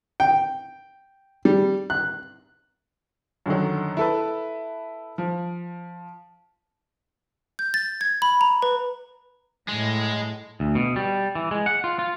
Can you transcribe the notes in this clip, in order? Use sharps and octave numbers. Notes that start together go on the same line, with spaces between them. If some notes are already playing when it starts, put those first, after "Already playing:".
G5
G3
F#6
F#2 D3 D#3 F#3
E4 A4 B4
F3
G6
A6
G#6
B5
A#5
B4
A2 G#3
D2
B2
G3
E3
G#3
F#5
F4
F4